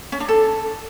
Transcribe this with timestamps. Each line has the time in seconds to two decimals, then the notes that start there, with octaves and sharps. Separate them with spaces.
0.12 C#4
0.20 D4
0.29 A4